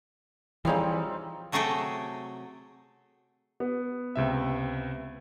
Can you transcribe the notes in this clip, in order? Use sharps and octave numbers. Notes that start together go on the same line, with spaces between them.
E3 F3 G3 C4 D#4 G#4 C#5 F5
C3 F#3 A3 G#4 A4 G5
B3
C#2 C3 E5